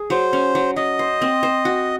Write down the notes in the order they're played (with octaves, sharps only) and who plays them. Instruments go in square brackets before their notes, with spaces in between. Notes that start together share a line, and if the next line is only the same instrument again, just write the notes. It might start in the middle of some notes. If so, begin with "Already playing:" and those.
Already playing: [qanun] G#4
[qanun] F#3 [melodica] C5
[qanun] C#4
F#3
[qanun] F#3 [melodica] D#5
[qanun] C5
C4
C5
F#4